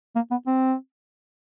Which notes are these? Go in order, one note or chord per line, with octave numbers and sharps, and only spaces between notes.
A#3
B3
C4